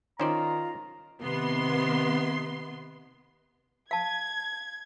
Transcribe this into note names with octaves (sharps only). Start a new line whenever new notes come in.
D#3 C#4 F4 C5 D5 A#5
C3 D#3 B3 C6
F5 A5 G#6